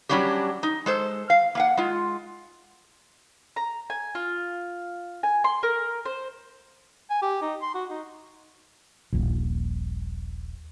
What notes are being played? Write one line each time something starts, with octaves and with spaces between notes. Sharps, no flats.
F#3 G3 C#4 D4 G4
D#4
G#3 A4 C5
F5
A#3 F5 F#5
G#3 F4
A#5
G#5
F4
G#5
C6
A#4
C5
G#5
G4
D#4
C6
F#4
D#4
D#1 A#1